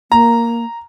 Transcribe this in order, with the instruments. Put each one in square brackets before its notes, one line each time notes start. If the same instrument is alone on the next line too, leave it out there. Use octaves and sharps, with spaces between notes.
[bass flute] A#3 [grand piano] A#5